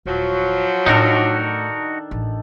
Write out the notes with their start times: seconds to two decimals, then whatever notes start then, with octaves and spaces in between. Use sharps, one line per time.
0.06 D#1 F3 F#3
0.86 A2 D#3 A3 D4 D#4 F#4 A4 A#4
2.11 A1